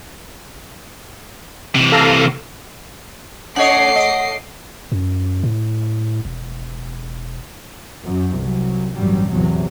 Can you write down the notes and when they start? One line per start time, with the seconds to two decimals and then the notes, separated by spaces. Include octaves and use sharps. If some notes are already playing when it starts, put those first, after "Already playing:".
1.75 C3 E3
1.92 A4 F5 A#5
3.56 A3 C#4 C#5 D#5 F#5 D6 C7
3.96 D#5
4.92 F#2
5.43 A2
6.25 E1
8.04 F#2 F#3
8.39 C2 F#3
8.94 A1 G2 F#3 G3
9.30 A1 E2 C3 F#3